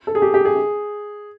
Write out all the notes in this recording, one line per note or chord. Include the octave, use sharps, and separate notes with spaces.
A4
G#4
G4
G4
G#4